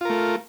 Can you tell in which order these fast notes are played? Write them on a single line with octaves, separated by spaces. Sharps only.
F4 A#4 A3